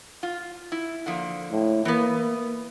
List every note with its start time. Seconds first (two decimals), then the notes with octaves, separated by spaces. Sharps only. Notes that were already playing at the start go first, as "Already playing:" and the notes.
0.23 F4
0.72 E4
1.06 D3 F3 A#3
1.52 A2
1.85 E3 A#3 B3